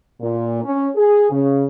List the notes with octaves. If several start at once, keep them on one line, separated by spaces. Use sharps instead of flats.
A#2
C#4
G#4
C#3